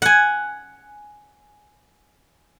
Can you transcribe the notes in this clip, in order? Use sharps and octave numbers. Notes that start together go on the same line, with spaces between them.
F#5 G#5